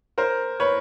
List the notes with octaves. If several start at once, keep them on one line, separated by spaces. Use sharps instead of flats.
A#4 C5
B4 C#5